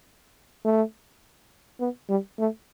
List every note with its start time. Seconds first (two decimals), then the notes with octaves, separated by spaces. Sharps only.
0.65 A3
1.80 B3
2.09 G3
2.39 A3